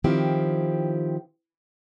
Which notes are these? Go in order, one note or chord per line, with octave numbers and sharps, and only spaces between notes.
D#3 F3 C4 E4 G4